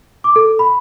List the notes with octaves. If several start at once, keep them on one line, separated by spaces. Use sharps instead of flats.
D6
A4
B5